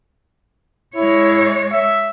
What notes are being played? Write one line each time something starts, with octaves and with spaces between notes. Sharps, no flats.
G#3 E4 C#5
E5